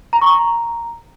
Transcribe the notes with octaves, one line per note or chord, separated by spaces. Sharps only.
A#5
C#6
A#5